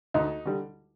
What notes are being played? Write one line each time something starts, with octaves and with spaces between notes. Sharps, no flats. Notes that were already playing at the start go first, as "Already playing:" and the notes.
D2 D#4
D3 G3